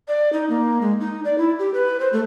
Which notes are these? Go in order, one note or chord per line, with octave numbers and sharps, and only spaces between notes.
D5
D#4
A#3
G#3
D#4
D5
E4
G4
B4
C5
A3